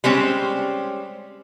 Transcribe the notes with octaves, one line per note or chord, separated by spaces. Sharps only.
G3 G#3 C4 C#4